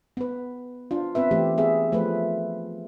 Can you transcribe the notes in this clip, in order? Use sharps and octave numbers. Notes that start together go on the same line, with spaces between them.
B3 B4
D4 F4
B3 C4 B4 E5
E3 A3 G4
B3 G#4 E5
F3 A3 F4 B4